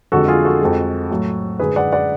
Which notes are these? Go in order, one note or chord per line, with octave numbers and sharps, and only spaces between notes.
F2 D3 G#3 F#4 A4
F4 G#4
F#4 A4
F2 F3 G#3
A2 F#3 A3
F#2 D3 G#3 G#4 B4
D5 F#5
D5 F#5